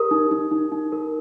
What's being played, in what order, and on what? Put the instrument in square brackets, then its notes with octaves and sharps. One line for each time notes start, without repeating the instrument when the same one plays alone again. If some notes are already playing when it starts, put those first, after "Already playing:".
Already playing: [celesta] G4 A#4 D#6
D#4
D#4
D#4
D#4
A#4